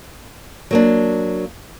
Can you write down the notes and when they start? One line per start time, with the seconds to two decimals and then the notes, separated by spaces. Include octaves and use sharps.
0.71 F#3 A#3 D4